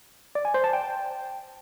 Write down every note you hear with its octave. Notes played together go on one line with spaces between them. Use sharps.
D5
G#5
C5
A5
G5